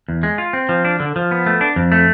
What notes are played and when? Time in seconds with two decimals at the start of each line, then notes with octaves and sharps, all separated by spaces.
0.08 E2
0.23 G#3
0.38 F4
0.53 C4
0.69 F3
0.85 D4
1.00 D3
1.16 F3
1.31 B3
1.46 A3
1.61 D4
1.76 F2
1.92 A3